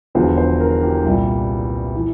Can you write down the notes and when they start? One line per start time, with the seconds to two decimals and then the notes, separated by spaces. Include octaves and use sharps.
0.15 E1 E2 D3 F3 C5
0.37 C5
0.60 A#4
0.82 G4
1.05 C2 A#2 G3
1.96 E3